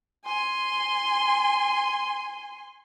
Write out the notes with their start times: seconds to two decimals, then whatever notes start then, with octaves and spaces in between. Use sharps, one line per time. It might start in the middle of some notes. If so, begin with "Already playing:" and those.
0.24 G#5 C6